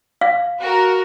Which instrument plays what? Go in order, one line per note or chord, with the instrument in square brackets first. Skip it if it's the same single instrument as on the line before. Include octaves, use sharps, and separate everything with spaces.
[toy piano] F5
[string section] F#4 A#4